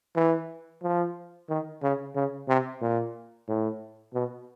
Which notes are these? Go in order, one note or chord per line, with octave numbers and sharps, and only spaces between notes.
E3
F3
D#3
C#3
C#3
C3
A#2
A2
B2